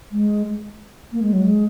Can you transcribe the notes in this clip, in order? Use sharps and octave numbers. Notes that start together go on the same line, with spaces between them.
G#3
A#3
G#3
F#3
G#3